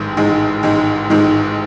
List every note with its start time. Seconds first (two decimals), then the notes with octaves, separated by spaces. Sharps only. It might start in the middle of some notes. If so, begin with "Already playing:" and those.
Already playing: A1 G#2 D#3 G#3
0.17 A1 G#2 D#3 G#3
0.63 A1 G#2 D#3 G#3
1.10 A1 G#2 D#3 G#3